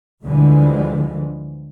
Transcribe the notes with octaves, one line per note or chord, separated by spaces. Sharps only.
D2 D3 E3 F3 G3 G#3